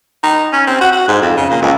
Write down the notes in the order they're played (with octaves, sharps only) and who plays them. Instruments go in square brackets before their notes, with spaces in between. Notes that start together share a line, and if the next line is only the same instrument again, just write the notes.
[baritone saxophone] D#4
C#4
C4
F#4
F#4
G#2
F2
C#3
A#2
C#2